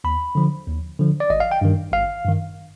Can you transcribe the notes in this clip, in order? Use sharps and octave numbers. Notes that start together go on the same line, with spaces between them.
D#2 B5
D3 F3
D#2
D3 F3
D5
G#1 D#5
F5
G5
G2 D#3
G#1 F5
G2 D#3